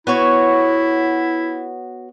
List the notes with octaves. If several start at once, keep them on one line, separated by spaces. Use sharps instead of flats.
B3 E4 F#4 C#5